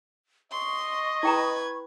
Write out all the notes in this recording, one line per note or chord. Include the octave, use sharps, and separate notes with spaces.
D#5 C6 C#6
E4 B4 G5 A#5 G#6